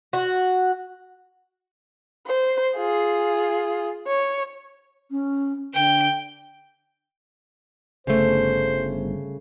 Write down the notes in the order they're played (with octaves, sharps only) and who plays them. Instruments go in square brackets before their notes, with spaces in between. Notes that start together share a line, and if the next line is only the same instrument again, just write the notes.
[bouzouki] F#4
[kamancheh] C5
F4 G#4
C#5
[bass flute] C#4
[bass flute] D3 [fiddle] G5
[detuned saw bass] G1 [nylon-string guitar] C#3 A3 [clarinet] C5